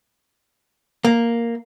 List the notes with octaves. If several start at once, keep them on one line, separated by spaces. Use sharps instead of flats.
A#3